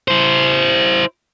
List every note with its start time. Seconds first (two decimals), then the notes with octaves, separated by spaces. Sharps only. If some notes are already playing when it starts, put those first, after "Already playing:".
0.08 E4 C5